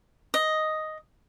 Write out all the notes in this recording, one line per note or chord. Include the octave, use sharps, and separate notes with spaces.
D#5